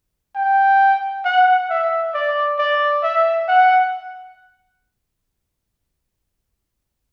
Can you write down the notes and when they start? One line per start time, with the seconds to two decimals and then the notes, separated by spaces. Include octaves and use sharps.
0.35 G5
1.25 F#5
1.70 E5
2.14 D5
2.59 D5
3.03 E5
3.48 F#5